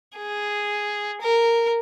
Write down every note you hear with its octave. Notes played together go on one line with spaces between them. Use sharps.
G#4
A#4